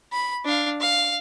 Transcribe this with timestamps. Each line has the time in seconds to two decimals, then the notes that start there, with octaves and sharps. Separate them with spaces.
0.13 B5
0.45 D4 F5
0.80 F5